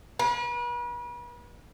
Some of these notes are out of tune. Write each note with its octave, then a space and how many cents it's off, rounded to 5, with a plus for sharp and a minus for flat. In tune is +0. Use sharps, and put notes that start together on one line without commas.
B4 -40